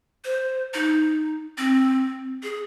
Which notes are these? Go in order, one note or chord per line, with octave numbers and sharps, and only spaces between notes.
C5
D#4
C4
G#4